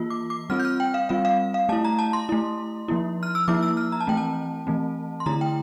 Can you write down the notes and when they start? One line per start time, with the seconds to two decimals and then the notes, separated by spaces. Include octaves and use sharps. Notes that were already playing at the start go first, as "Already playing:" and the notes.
Already playing: E3 A#3 F4
0.10 D6
0.30 D6
0.50 G3 C4 F4 F6
0.59 G6
0.65 F6
0.80 G5
0.94 F5
1.09 G3 C4 F4 F5
1.25 F5
1.54 F5
1.69 A3 E4 A5
1.85 A#5
1.99 A5
2.13 C6
2.29 A3 E4
2.88 F3 A#3 E4
3.23 F6
3.35 E6
3.48 F3 A#3 E4 D6
3.63 E6
3.77 F6
3.92 A#5
4.00 A5
4.07 E3 A3 C4 G5
4.17 A5
4.67 E3 A3 C4
5.20 C6
5.26 D3 A3 E4 A#5
5.41 G5